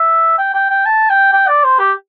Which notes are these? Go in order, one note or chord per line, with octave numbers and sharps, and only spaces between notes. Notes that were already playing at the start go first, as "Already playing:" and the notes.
Already playing: E5
G5
G5
G5
A5
G5
G5
D5
C5
G4